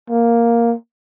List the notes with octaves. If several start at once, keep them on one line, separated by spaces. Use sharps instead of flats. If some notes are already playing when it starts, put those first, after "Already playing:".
A#3